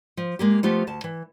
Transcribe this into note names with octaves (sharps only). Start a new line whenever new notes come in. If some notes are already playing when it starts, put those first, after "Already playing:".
F3
G#3 A#3 G4
F3 A3 B3 F4 G4
D2 A5
E3